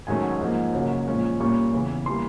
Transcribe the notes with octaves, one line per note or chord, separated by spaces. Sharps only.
G#2 D#3 F#3 A3 C#4 G#5
G#2 F3 A#3
F#2 C#3 F#3 A#3 C#4
A#2 F3 G#3 C#4
A#2 G3 A#3 C#4 C#6
E2 C#3 E3
E3 G3 A#3 C6